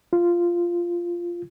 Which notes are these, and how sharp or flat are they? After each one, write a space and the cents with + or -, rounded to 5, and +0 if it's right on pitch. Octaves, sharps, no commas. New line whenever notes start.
F4 -10